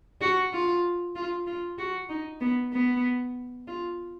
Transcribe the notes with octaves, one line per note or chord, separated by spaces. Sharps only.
F#4
F4
F4
F4
F#4
D#4
B3
B3
F4